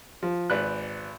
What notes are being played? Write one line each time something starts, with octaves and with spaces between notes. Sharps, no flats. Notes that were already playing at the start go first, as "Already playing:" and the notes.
F3
G#1 B4 D5 F#6